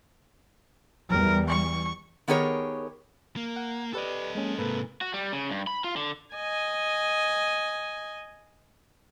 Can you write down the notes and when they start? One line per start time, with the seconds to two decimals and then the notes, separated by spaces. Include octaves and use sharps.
1.10 E2 E3 G3 A#4
1.48 C#6
2.28 D#3 B3 G4 G#4 A#4 C#5
3.37 A#3
3.56 F#5
3.93 G4 A4 B4 D5 D#5
4.35 G#3 A#3 C#4
4.58 G#2 C3 A#3 A4 B4
5.01 F#4
5.14 G3
5.33 C#3
5.51 G2
5.67 B5
5.84 F4
5.96 D3
6.35 D#5 G#5